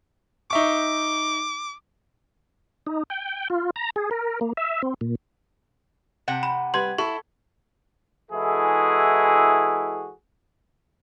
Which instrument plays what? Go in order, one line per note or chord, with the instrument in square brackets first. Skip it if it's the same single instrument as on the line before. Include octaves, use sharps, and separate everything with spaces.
[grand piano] D#4 E5 C#6 [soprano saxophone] D6
[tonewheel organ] D#4
G5
F4
A#5
G#4
A#4
A#3
E5
C4
A#2
[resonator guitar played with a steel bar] C3 F#5 G5
[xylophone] B5
[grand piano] G3 B4 G#6 [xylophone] C6
[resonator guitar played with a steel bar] E4 [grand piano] A4 [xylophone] C#6
[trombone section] E3 G#3 E4 F#4 G#4 A4